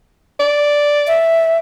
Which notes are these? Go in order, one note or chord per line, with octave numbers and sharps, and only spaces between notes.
D5
E5